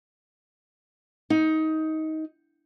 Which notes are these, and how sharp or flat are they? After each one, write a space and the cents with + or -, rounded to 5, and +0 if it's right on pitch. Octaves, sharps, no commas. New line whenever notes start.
D#4 +20